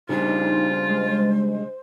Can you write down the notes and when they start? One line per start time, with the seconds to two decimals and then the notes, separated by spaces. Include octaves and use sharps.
0.09 C#3 G3 D4 D#4 F4 C5
0.89 G#3